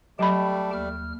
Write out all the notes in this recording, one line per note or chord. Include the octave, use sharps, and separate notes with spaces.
F#3 G3 A3 G4 G5 A5 B5
D#2 F6